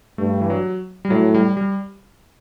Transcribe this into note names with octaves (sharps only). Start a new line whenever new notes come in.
G2 A3
E3
F#3
G3
A2 F#3
G3
G3